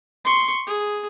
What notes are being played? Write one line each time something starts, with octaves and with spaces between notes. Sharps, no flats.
C6 C#6
G#4